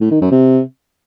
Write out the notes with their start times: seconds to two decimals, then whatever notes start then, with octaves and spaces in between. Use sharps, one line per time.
0.01 A2
0.11 D#3
0.21 F#2
0.31 C3